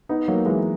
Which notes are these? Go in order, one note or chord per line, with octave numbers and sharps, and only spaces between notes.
B3 D#4
F#3 A#3
E3 G#3